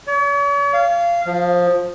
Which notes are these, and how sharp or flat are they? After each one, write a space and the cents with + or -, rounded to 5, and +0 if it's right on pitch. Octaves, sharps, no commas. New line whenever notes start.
C#5 +45
F5 -20
F3 +15